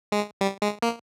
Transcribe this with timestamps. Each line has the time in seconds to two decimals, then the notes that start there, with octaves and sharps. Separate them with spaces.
0.12 G#3
0.41 G3
0.62 G#3
0.82 A#3